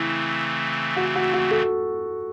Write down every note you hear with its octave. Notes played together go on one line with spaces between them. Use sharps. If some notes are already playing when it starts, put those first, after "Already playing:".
Already playing: C#3 E3 A3 C4 E4
F#4
F#4
F#4
A4